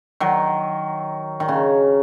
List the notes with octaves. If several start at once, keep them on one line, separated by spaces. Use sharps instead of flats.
D#3 F#3
D#3
C#3